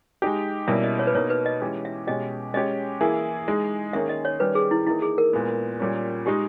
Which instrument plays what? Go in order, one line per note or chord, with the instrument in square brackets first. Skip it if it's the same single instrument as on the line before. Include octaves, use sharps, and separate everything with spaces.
[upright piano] G#3 D#4 G4
[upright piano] B2 G3 A#3 C#4 E4 [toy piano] E5
[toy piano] D#5
C#5
B4
[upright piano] B2 A#3 D#4 [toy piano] C#5
[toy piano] B4
D#5
[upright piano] E3 G#3 C#4 G4
[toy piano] E5
[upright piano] B2 G#3 C#4 G4 [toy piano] D#5
[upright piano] G#3 C#4 G4 [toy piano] D#5
[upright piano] E3 A#3 E4 G#4
G#3 D#4 G#4
[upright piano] D#3 A#3 C#4 G#4 [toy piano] E5
[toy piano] D#5
C#5
[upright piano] D#3 G3 C#4 G4 [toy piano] B4
[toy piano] G#4
E4
[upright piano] E3 A#3 D#4 [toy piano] E4
[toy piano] G#4
A#4
[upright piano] A#2 G#3 B3
A#2 G3 C#4
[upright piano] G#3 D#4 G#4 [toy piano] G4